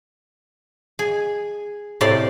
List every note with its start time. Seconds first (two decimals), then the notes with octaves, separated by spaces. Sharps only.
0.99 G#4
2.01 A2 C3 D5 C6